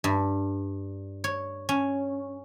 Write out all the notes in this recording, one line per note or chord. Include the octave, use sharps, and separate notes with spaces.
G2
C#5
C#4